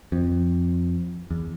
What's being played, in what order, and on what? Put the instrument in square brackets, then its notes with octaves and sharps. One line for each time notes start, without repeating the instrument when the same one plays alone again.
[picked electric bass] F2
E2